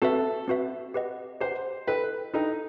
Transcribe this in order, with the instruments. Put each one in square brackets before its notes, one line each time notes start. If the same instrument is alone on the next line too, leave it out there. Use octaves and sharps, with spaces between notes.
[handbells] C4 F#4 B4 E5 [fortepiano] A4
[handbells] C4 F#4 B4 E5
G4 B4 D#5 F#5
[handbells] G4 B4 D#5 F#5 [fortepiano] C5
[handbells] E4 A4 D#5 G5 [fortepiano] B4
[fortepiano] D#4 [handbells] E4 A4 D#5 G5